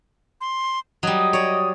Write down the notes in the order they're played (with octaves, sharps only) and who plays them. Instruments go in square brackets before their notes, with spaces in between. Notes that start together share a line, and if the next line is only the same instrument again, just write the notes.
[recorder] C6
[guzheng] F#3 G3 [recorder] D#5 [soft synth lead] D#6
[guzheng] C#5 D5